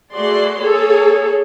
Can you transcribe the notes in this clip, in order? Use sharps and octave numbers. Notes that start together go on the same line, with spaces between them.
A3 F#4 G#4 D5 C6
A#3 G#4 A4 C#5